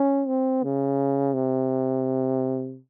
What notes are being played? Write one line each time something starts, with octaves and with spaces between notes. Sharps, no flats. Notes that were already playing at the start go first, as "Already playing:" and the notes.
Already playing: C#4
C4
C#3
C3